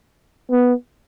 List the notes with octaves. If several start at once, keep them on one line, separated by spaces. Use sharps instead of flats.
B3